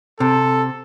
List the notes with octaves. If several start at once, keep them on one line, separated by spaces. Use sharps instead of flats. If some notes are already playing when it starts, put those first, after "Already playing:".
C3 A4